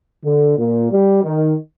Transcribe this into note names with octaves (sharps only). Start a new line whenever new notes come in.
D3
A#2
G3
D#3